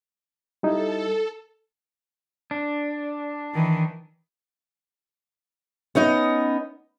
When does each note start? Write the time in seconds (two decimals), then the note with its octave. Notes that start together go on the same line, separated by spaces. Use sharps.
0.63 G3 D#4 E4 A4
2.51 D4
3.54 D#3 E3
5.95 B3 C#4 D#4 D#5